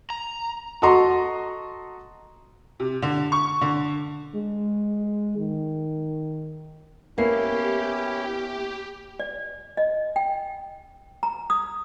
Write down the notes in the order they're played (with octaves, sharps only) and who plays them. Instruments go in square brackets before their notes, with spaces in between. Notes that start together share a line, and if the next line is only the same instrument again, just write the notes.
[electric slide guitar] A#5
[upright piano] F#4 A4 D#5 A#5 C6 C#6
C3
D3
C#6
D3
[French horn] G#3
D#3
[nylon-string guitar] A#3 [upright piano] B3 C7 [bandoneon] C#4 E4 [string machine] G4
[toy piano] D5
D#5
G5
A#5
D#6